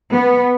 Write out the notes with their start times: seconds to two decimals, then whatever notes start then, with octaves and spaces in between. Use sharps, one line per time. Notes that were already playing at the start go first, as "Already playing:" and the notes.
0.12 B3